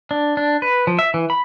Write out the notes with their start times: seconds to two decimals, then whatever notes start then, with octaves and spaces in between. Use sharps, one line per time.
0.11 D4
0.37 D4
0.62 B4
0.87 F3
0.99 E5
1.14 E3
1.30 B5